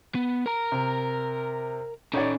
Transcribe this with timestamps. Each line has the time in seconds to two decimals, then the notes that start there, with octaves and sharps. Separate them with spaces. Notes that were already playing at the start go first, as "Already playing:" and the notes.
0.15 B3
0.46 A#4 A#5
0.72 C3
2.14 C#4 D#4 A4 C#5 D5